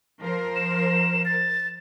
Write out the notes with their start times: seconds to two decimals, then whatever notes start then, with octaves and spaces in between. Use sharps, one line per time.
0.22 F3 A#4 C5
0.56 E7
1.25 A6